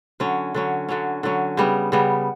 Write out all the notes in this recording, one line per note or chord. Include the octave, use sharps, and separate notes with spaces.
D3 F#3 C#4
D3 F#3 C#4
D3 F#3 C#4
D3 F#3 C#4
C#3 G3 B3
C#3 G3 B3